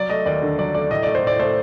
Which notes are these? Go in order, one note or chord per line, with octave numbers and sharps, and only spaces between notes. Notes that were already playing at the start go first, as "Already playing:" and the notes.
Already playing: F#3 D5
A3 D#5
D#2 D5
D3
F#3 D5
A3 D5
A2 D#5
A3 D5
C5
A2 D5
A3 C5